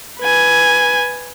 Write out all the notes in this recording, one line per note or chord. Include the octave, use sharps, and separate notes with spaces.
B4 G#5